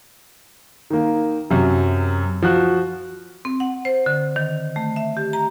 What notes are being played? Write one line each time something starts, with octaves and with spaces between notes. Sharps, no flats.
D#3 A#3
F#2 C3
F3 F#4 F#6
C4
F#5
C5
D3
D#3
A3
E5
G4
A#5